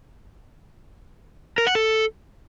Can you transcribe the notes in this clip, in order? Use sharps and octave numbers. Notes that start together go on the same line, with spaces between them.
A#4
F#5
A4